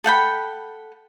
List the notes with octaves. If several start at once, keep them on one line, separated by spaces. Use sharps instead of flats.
A4 F#5 G5 B5